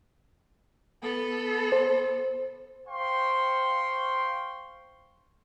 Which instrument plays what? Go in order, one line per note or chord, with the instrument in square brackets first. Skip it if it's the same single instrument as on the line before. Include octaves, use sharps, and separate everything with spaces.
[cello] B3 A4
[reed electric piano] C5
[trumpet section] C5 F5 G5 C6 C#6